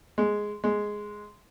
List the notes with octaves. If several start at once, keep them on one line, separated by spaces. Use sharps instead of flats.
G#3
G#3